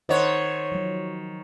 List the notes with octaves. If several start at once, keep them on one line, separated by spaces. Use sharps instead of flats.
D#3 C5 C#5 F#5
F3 F#3